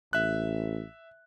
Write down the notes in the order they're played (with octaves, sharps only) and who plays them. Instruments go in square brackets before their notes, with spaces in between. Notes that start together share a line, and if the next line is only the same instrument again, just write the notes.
[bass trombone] A1 [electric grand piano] E5 F#6